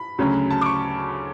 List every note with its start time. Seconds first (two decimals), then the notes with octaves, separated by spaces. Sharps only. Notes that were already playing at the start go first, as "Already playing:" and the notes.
Already playing: B5
0.18 D2 C#3 F#3 C#4
0.51 A5
0.61 D6
0.66 C#6